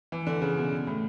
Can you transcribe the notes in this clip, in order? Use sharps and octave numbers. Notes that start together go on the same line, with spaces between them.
E3
D3
C#3
B2
A2